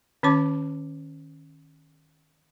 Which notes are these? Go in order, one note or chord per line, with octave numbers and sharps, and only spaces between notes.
D#3 C#4 C#5 A5 D6